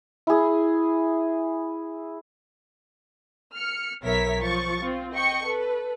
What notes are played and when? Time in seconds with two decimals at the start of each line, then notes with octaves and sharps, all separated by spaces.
0.27 E4 G#4
3.54 F6 C#7
4.04 B1 B3 A#4 C#5 E5 B6
4.39 F3 C#6 A6
4.82 C4 F4
5.14 D#5 G5 C#6 C#7
5.45 A4 B4